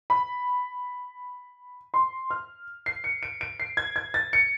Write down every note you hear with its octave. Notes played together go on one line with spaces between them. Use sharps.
B5
C6
F6
C7
C#7
D7
D7
C7
G#6
G#6
A6
C#7